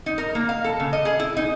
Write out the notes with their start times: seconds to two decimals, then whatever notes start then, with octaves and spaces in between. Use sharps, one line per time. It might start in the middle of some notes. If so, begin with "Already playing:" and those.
0.06 D#4
0.18 A#4
0.35 A#3
0.49 F5
0.64 A4
0.80 C#3
0.93 D#5
1.05 G#4
1.19 E4
1.37 D#4